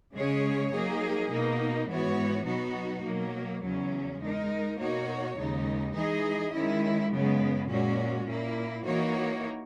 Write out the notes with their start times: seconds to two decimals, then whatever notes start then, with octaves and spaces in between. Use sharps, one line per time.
0.14 C#3 G#3 C#4 G#4 C#5
0.71 F#3 A#3 D#4 G#4
1.29 B2 A#3 D#4
1.88 G#2 E3 B3 F#4 C#5
2.46 B2 F#3 B3 D#4 F#4
3.04 B2 F#3 A#3
3.62 E2 C#3 F#3 C#4
4.20 G#3 D#4 A#4
4.78 B2 A#3 D#4 F#4 C#5
5.37 D#2 C#3 G#3 D#4
5.94 E3 G#3 D#4 G#4 D#5
6.53 D#3 G#3 C#4 E4
7.11 F#2 C#3 G#3 B3
7.69 A#2 G#3 C#4 F#4
8.27 A#2 A#3 E4
8.85 E3 A#3 D#4 F#4 C#5